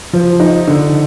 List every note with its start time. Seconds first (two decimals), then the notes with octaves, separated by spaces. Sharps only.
0.13 F3
0.40 D#4
0.67 D3